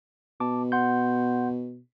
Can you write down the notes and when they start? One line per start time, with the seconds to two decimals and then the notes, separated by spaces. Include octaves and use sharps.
0.40 B2 A5 D6
0.72 F#5 C6 G6